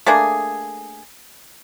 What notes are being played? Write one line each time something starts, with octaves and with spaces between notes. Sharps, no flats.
A3 A#3 D4 G#4